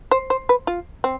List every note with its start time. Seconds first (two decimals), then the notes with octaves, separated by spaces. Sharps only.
0.11 C5
0.30 C5
0.49 B4
0.67 F4
1.04 C4